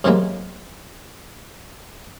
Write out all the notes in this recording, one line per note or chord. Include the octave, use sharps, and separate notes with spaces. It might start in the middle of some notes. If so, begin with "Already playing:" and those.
F#2 C3 E3 F#3 G#3 A#3